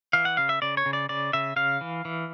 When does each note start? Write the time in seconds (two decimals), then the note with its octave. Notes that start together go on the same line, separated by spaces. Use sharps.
0.13 E3 F5
0.25 F#5
0.37 C#3 F5
0.49 E5
0.62 C#3 D5
0.77 C#5
0.86 C#3
0.93 D5
1.09 C#3 D5
1.33 C#3 E5
1.56 C#3 F5
1.81 E3
2.05 E3